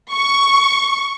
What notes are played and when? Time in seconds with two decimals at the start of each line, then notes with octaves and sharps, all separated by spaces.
0.12 C#6